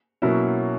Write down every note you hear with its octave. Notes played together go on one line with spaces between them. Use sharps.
B2 F#3 A#3 C#4 E4